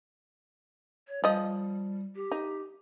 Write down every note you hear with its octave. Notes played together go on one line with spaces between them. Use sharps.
C#5
F3 G3 D#5
G4
D#4